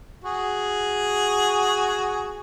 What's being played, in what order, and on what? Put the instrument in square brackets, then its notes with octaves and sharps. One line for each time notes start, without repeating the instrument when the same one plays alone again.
[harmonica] F#4 G#4